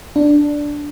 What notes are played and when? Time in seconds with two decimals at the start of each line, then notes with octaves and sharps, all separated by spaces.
0.16 D4